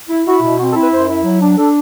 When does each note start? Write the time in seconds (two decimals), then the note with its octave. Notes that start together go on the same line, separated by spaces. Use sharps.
0.09 E4
0.26 E4 F#4
0.42 B2
0.58 C4 F#4
0.69 A4
0.75 E4
0.80 B4
0.91 F#2 C5
1.08 E4
1.24 F#3
1.41 D4
1.57 D4 A4